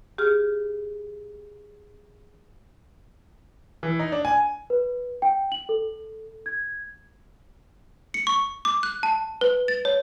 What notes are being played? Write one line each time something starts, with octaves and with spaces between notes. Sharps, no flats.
G4 G#4 F6
E3
D#4
D4
G#5
B4
G5
F#7
A4
G#6
C#7
C#6
D6
F#6
A5
B4
A6
C#5